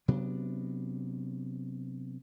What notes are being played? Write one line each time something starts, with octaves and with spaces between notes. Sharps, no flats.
C3 F#3 B3 D4